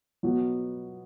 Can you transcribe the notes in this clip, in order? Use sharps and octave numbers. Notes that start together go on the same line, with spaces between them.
B2 F#3 B3 F#4